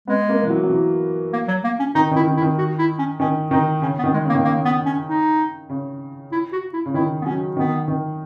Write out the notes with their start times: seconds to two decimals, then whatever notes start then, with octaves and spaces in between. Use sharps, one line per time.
0.07 G#3 B3
0.29 A#3
0.43 E3
0.50 F#3
0.64 F#3
0.70 E3
1.33 A#3
1.48 F#3
1.64 A#3
1.79 C#4
1.95 D#3 D#4
2.11 D#3
2.16 E4
2.27 D#3
2.37 E4
2.42 D#3
2.58 F#4
2.79 E4
2.99 C#4
3.20 D#3 C#4
3.51 D#3 D#4
3.82 C#3 C#4
3.98 B3
4.04 D#3
4.13 G#3
4.24 C#3
4.29 A#3
4.35 D#3
4.45 C#3 A#3
4.65 B3
4.86 C#4
5.07 D#4
5.70 C#3
6.32 E4
6.52 F#4
6.73 E4
6.86 C#3
6.94 D#3 E4
7.22 B3
7.25 F#3 C#4
7.56 D#3 B3
7.88 D#3